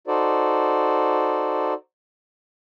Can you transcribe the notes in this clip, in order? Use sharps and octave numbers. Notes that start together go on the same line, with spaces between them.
D#4 F#4 A4 C5 D5